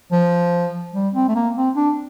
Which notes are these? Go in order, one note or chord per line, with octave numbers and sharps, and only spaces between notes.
F3
G3
C4
A3
A#3
C4
D4